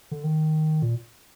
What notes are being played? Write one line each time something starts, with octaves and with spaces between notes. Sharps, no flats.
D3
D#3
A#2